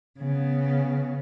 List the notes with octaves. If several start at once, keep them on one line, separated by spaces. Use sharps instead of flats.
C#3 B3